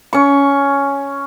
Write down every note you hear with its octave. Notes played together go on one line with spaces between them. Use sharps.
C#4 C#6